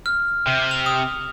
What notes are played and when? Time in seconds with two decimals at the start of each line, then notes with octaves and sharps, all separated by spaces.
0.06 F6
0.47 C3
0.71 F7
0.86 D#6